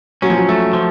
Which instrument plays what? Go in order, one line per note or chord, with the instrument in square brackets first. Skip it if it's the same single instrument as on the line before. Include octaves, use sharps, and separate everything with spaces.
[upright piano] F#3 [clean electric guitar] C#4
[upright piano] F3
F#3
[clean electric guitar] A3
F3